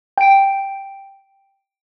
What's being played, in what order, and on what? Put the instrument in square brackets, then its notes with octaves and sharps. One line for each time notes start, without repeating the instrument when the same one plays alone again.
[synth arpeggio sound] G5 D7